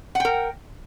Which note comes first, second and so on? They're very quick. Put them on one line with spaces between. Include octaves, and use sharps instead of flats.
F#5 G5 A#4